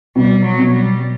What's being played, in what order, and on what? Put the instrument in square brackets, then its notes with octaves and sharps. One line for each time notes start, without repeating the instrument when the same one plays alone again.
[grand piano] B2 [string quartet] G3
[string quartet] F#3
[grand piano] B2
[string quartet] G3